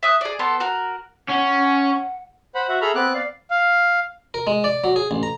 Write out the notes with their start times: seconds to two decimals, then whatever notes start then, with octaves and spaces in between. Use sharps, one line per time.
0.03 E5 D#6 F#6
0.21 G#4 D5
0.39 B3 A4 C6
0.60 F#4 A#4
1.29 C#4 F#5
2.55 C5 F#5 B5
2.69 F#4 E5 F#5
2.81 G#4 A4 E5 A#5 B5 F6
2.95 B3 C4 D6 F#6
3.14 D5 F5
3.50 F5
4.34 A#4
4.47 G#3
4.64 D5
4.84 F#3
4.96 G#4
5.11 A1
5.23 A#5